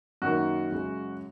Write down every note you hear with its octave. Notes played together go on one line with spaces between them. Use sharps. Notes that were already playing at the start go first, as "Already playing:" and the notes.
F#2 D#3 A#3 F#4
F#2 C#3 G#3